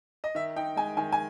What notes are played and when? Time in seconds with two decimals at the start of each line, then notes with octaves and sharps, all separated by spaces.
0.24 D#5
0.35 D#3 E5
0.56 D#4 G5
0.76 G#3 G#5
0.97 D#3 G#5
1.12 G#5